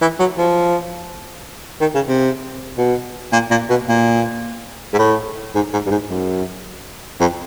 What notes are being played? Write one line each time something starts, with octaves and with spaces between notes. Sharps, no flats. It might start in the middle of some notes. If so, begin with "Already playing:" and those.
E3
F#3
F3
D#3
C#3
C3
B2
A#2
A#2
B2
A#2
G#2
A2
G#2
G#2
G2
G#2
F#2
F2